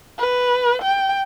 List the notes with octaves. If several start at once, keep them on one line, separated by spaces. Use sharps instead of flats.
B4
G5